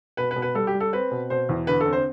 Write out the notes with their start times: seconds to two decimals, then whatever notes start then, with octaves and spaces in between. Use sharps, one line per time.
0.17 B2 B4
0.31 B4
0.36 B2
0.42 B4
0.55 G3 A4
0.67 G4
0.74 G3
0.80 A4
0.93 C4 B4
1.11 B2
1.30 B2 C5
1.49 E2
1.67 D3 B4
1.80 A4
1.86 C4
1.92 C5